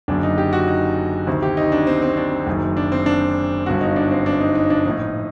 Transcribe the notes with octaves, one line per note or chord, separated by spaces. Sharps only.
F#1 F#2 D3 D4
D#4
G4
F#4
D#4
D2 C3 D#3 C4
G4
D#4
D4
C4
C4
D4
F#1 F#2 D#3
D4
C4
D4
G1 G2 D3 F#4
D#4
D4
C4
D4
D#4
D#4
D4
A#1 A2 D#4